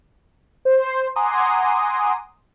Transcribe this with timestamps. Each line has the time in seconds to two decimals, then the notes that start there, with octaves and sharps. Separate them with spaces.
0.65 C5
1.16 F#5 G#5 A#5 C6 D6 D#6